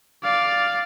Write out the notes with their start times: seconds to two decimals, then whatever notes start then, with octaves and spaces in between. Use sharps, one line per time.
0.24 D5 F5